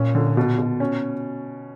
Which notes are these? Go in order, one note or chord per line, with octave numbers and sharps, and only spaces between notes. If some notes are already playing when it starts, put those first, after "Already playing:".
Already playing: A#2 C#4
D3
B2
B2
C#4